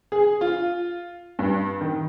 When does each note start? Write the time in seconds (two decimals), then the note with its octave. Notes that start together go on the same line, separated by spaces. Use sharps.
0.12 G#4
0.41 F4
1.39 G2
1.81 D#3